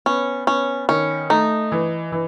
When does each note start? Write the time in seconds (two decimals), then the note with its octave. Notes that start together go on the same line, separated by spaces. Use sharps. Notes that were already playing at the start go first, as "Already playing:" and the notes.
0.06 B3 C#4
0.47 B3 C#4
0.89 D#3 C#4
1.30 A3 D#4
1.72 E3
2.12 E3